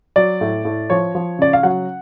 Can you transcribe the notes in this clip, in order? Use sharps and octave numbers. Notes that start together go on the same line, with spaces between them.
F#3 D5
A2
A2
F3 C#5
F3
C#3 D5
F5
F#3 F#5